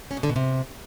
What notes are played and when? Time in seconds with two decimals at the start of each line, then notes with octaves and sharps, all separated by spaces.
0.11 C#4
0.17 B2
0.23 D3
0.30 B2
0.36 C3